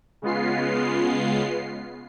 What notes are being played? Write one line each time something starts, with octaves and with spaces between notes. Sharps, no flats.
C#3 G#3 B3 F4 C7